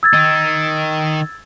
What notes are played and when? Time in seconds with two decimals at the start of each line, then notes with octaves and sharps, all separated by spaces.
0.03 E6 G#6 A6
0.14 D#3 D#4